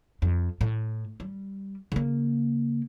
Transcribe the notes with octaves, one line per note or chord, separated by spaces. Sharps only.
F2
A2
G3
C#3 A#3